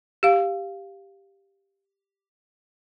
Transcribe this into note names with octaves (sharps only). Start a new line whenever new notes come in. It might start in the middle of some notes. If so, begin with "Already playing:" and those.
G4 F5